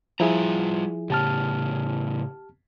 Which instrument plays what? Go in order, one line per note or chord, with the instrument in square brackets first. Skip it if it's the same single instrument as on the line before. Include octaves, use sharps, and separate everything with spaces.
[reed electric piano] F3 E4 G#4 [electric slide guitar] G3 F4 A#5
[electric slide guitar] A2 C#3 [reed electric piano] G4 A5 F6